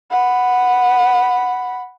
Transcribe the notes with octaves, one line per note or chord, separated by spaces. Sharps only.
F#5 B5